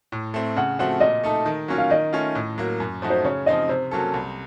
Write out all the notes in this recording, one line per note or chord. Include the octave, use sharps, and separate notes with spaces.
A2
A3 C4
C#3 F#5
F3 A3 C4 F#4 F#5
A#2 D#5
A3 D#4 A4
D#3
F#3 A#3 C#4 F4
F5
D#3 D#5
A3 C#4 F4
A2
F#3 A#3
F#2
F3 A3 D#4 F#4
C5
C#3 C#5
F3 C4 D#4 D#5
C3 C5
F#3 A#3 C#4 A4
C2